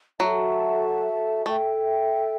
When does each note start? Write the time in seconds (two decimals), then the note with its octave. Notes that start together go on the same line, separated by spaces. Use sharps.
0.19 F#3 F#4 A4 E5 A5
1.45 A3 A4 E5 G5